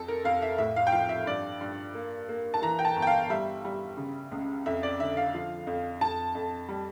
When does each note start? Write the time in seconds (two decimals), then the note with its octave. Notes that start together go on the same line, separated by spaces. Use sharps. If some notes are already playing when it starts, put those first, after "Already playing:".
Already playing: F2 A4
0.08 A#4
0.24 F2 F5
0.42 E5
0.58 A2 E5
0.76 F5
0.87 G5
0.92 F3 F5
1.09 E5
1.26 G2 D5
1.61 G2
1.95 A#3
2.29 A#3
2.54 A5
2.62 E3 A#5
2.79 G5
2.85 A5
2.96 G1
3.02 G5
3.07 F5
3.30 G3 E5
3.65 G3
3.97 C#3
4.32 C#2
4.66 F2 E5
4.83 D5
4.99 D3 E5
5.17 F5
5.34 F3
5.67 F2
6.01 F2 A5
6.35 F2
6.68 G3